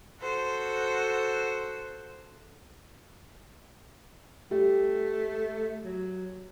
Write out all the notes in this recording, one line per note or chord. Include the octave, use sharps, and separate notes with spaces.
F#4 A4 C5
A3 G4
F#3